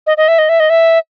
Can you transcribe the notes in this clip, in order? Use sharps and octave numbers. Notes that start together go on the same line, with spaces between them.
D#5
D#5
E5
D#5
E5
D#5
E5